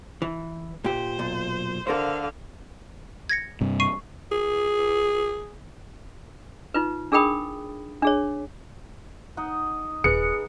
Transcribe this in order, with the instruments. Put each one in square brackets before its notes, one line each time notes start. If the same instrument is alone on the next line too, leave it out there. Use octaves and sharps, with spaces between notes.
[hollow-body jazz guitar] E3
[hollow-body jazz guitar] A#2 G4 [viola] C5
[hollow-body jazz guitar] B1 A#2
[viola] D3 F5 [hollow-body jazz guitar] A4 A#4 C5
[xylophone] G#6 A#6 C#7
[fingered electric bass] G2 C3
[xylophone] C#6 C7 D#7
[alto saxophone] G#4
[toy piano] D#4 F4 B4
D4 G#4 A#4 G5 B5 D#6
D4 G#4 C#5
[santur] D#4 D#5 F#5
[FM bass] D#1 [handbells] G#4 B4 [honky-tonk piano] C#7